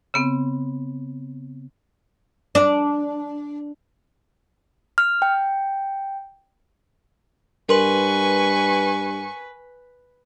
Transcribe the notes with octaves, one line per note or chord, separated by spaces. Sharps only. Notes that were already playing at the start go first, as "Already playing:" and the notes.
C#3 B3 C4
D4
F6
G5
G2 A#4 B4 G#5 C6 C#6 F#7